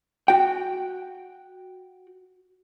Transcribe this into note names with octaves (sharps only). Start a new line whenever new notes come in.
F#4 G5